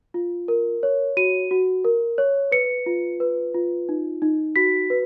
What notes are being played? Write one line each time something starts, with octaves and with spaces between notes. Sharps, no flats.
F4
A#4
C#5
F#4 D#7
F#4
A#4
C#5
B4 C#7
F4
B4
F4
D#4
D#4
F#4 B6
B4